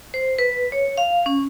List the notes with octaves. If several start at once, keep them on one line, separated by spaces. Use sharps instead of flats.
C5
B4
C#5
F5
C#4